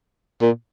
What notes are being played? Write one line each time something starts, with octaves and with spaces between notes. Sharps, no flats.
A#2